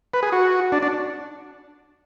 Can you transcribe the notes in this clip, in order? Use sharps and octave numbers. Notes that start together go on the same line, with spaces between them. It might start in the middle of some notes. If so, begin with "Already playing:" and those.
B4
G#4
F#4
D4
D4